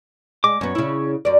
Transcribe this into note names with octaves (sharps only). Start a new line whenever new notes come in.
G#3 D6
F#2 B3 C#5
C#3 E4
F#2 D5